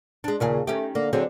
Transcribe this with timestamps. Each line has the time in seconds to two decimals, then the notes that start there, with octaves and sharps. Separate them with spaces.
0.24 G#3 D4
0.40 D#2 A#2 C#3 G#4
0.67 D#3 A3 C#4 G4
0.95 D3 A#3
1.13 D3 F#3 C4 G#4